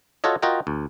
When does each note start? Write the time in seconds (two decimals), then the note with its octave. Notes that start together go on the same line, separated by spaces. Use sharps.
0.24 F4 F#4 A4 C#5 D#5
0.42 F4 F#4 A#4 D#5 G5
0.67 D2